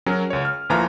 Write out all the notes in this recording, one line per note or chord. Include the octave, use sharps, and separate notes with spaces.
F#3 C#4 G#4 A#4
C#2 C#5
F6
D2 A#2 E3 F3 A#5 F6